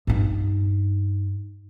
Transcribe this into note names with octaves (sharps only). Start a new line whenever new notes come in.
G2 D#4